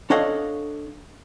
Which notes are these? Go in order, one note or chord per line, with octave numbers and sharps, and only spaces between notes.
D4 A4 C#5 D#5 F5 F#5